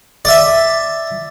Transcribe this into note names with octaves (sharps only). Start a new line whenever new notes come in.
D5 E5